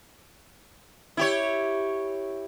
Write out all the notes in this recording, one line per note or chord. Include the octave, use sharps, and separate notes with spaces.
E4 G4 C#5